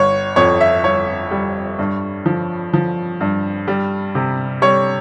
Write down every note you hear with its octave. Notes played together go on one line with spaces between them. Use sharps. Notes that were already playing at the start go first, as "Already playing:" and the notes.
Already playing: G1 C#5
F2 C#5
E5
G1 C#5
G3
G2
F3
F3
G2
G3
C3
G3 C#5